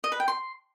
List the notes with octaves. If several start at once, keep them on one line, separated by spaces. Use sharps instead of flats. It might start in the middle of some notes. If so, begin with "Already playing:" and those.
D#5
B4
G5
C6